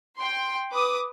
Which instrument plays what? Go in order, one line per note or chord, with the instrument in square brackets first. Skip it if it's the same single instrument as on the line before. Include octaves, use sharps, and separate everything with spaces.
[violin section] G5 C6
B4 D6 D#6